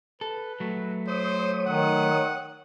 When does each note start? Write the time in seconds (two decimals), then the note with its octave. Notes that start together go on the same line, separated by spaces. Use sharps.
0.21 A4 B4
0.60 F#3 A3
1.07 C5 C#5 D#6
1.66 D#3 F#5